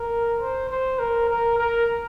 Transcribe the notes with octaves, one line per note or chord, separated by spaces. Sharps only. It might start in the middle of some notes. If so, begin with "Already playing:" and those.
Already playing: A#4
C5
C5
A#4
A#4
A#4